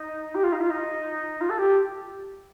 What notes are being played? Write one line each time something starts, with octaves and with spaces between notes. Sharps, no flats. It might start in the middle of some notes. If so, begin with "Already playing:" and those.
Already playing: D#4
G4
F4
D#4
F4
D#4
F4
A4
G4